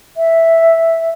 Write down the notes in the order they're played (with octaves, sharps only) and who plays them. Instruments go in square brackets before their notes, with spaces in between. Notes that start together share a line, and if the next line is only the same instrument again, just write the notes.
[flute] E5